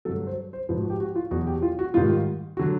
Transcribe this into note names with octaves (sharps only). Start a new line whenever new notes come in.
G2 D3 F#3 A4
C5
C5
G#2 F3 B4
F#4
G4
F#4
F4
E2 B2 F#3 F#4
G4
F4
F#4
G#2 D#3 G3 F4
D3 F#3 F#4